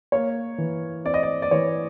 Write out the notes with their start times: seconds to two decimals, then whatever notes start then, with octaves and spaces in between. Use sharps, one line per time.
0.12 A#3 C#5
0.58 E3
1.05 C4 D5
1.14 D#5
1.23 D5
1.42 D5
1.51 E3 C#5